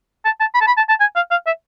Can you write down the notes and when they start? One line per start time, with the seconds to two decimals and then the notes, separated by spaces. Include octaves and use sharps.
0.25 A5
0.40 A5
0.54 B5
0.61 A5
0.67 B5
0.77 A5
0.89 A5
1.00 G#5
1.16 F5
1.31 F5
1.46 E5